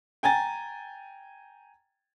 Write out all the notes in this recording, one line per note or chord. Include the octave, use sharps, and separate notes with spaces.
G5 G#5 A#5 A6